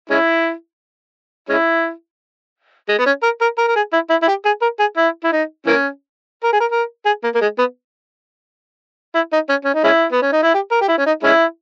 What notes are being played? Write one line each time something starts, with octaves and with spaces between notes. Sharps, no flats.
G#3 C#4 E4
G#3 C#4 E4
G#3
B3
C#4
A#4
A#4
A#4
A#4
G#4
E4
E4
E4
G4
G#4
A#4
G#4
E4
E4
D#4
E3 A#3 C#4
A#4
G#4
A#4
A#4
G#4
A#3
A#3
G#3
B3
E4
D#4
C#4
C#4
D#4
G#3 C#4 E4
B3
C#4
D#4
E4
G4
A#4
G4
E4
C#4
D#4
G#3 C#4 E4